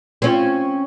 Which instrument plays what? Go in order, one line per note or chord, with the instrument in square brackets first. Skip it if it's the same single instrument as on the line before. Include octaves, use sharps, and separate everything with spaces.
[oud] C4 C#4 F4